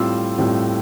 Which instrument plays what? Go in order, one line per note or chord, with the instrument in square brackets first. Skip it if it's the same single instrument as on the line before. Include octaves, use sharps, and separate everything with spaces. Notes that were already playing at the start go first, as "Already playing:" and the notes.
Already playing: [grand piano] A2 G3 C4 F4 E6
A2 G3 C4 F4